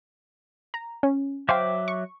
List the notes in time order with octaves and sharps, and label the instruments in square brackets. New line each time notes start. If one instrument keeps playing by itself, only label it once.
[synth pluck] A#5
C#4
[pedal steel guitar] F#3 E5 D6 [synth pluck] C5 F5 G5
[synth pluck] C#6